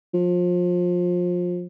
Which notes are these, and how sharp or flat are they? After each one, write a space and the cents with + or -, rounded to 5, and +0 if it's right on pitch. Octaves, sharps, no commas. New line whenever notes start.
F3 +25